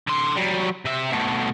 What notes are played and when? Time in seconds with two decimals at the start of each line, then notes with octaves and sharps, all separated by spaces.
0.07 D3 C6
0.36 F#3 G3
0.85 C3 E5
1.12 B2 A3